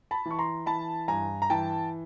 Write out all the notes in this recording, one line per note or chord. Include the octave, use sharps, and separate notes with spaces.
A5 B5
E3
C#6
A#5 C6
E3 A5 B5
G2 G#5 A#5
A#5
E3 G5 A5